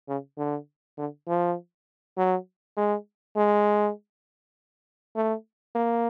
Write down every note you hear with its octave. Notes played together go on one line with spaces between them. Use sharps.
C#3
D3
D3
F3
F#3
G#3
G#3
A3
A#3